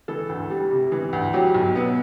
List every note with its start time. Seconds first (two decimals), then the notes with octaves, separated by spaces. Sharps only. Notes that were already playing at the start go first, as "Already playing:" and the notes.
0.08 E3 A4
0.29 D2
0.50 G3
0.71 C3
0.92 E3
1.13 D2
1.33 F#3 G4
1.54 B1
1.75 B3